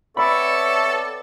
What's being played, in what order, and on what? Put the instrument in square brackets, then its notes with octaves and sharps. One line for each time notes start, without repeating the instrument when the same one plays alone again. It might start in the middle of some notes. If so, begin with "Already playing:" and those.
[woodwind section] B3 C4 D5 [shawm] A4 [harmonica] C#5 E5 C#6 [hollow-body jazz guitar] B5